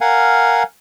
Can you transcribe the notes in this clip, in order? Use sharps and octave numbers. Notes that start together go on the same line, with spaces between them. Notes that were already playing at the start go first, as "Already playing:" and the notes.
A#4 F5 F#5 G#5